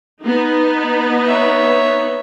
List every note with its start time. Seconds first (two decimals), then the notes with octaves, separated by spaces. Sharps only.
0.22 B3 D#4
1.25 C#5 E5